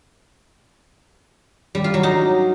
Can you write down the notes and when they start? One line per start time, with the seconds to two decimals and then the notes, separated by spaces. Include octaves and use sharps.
1.75 G3
1.84 F4
1.94 F#3
2.03 D#4